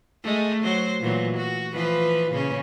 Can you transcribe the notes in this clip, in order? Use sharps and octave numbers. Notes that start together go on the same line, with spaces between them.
G#3 A3
F#3 C5
A#2 E3 F#3
F#4
E3 F3 B4
A#2 C#3 C#4